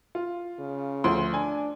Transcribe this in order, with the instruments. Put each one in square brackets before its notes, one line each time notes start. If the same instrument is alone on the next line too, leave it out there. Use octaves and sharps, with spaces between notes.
[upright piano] F4
[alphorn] C#3
[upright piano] D2 F3 C6
[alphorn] D4 [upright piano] G#5